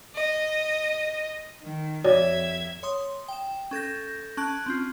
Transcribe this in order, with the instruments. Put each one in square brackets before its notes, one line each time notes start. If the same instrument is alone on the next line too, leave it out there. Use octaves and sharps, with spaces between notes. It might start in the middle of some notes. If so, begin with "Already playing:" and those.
[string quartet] D#5
D#3
[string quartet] F2 E5 G#6 [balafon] F#4 C#5 D5
[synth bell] C#5 C6 D#6
G5 E7
C#4 A4 G6 A#6
C#4 A5 F#6 D7 F#7
C4 C#4 F4